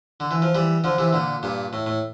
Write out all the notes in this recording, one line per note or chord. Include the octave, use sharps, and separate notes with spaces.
D3
E3
F3
E3 G3
D3 F3
C3 E3
A#2 D3
G2 A#2
A2
A2